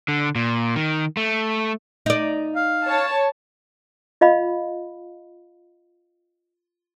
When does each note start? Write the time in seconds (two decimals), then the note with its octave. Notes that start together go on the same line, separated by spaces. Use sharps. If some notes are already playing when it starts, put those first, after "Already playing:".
0.08 D3
0.35 A#2
0.76 D#3
1.17 A3
2.06 D#4 D5
2.55 F5
2.86 C#5 A5
4.21 F4 D#5 F5 B5